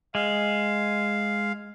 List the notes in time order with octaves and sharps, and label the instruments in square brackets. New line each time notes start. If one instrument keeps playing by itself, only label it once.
[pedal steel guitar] G#3 [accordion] F5